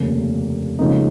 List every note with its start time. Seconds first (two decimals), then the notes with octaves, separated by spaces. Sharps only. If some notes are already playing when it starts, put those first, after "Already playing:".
Already playing: F1 D#2 C#3 A#3
0.79 C#2 C#3 F3 A#3 D#4